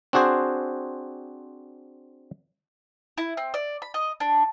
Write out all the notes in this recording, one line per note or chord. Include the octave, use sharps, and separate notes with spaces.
C4 D4 F#4 G#4 C5
E4
C4
D5
B5
D#5
D4